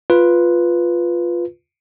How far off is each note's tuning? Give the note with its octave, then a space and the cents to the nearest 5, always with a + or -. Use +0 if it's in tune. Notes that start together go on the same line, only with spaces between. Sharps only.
F4 +0 B4 +0